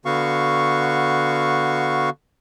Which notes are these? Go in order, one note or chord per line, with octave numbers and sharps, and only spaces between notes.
D3 B3 F#4 F5 C#6